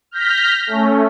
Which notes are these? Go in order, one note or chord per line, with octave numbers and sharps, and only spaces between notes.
F6 G6 A#6 B6
A3 C#4